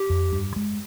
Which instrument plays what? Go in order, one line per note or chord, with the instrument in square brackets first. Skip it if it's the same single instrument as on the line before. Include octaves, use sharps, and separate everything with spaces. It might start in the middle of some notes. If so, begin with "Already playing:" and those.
Already playing: [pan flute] G4
[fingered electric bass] F2
G2
G#3